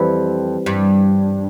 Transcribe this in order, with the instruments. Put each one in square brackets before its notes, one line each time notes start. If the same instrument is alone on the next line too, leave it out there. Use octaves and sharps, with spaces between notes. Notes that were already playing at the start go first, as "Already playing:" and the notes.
Already playing: [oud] F2 [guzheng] E3 G3 C4 E4
[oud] G2